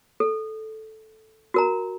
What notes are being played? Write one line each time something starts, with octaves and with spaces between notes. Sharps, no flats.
A4
F#4 A#4 A#5